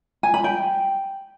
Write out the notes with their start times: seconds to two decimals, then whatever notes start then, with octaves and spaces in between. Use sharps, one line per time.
0.23 G#5
0.34 B5
0.44 G5